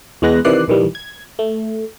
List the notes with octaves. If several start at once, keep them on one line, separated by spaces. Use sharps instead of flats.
E2 G#3 B3 F#6 A#6
C3 D#3 E3 D5 F#6 C7
A#1 D#3 E3 G3
G#6
A3